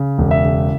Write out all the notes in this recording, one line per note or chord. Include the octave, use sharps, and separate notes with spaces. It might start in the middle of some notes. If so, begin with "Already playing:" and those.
Already playing: C#3
E1
E5
C#3